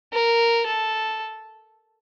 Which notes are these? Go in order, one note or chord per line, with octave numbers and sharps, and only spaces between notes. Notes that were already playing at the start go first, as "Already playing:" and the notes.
A#4
A4